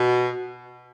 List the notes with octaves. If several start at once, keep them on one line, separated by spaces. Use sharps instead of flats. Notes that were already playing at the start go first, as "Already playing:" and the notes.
Already playing: B2